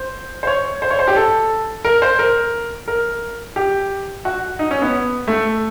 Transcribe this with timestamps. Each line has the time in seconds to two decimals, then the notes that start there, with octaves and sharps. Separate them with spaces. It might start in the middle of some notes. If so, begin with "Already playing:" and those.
Already playing: C5
0.43 C5
0.47 C#5
0.82 C5
0.91 C#5
0.99 C5
1.08 G4
1.16 A4
1.85 A#4
2.02 C5
2.19 A#4
2.88 A#4
3.56 G4
4.25 F#4
4.59 D#4
4.71 C#4
4.82 B3
5.28 A3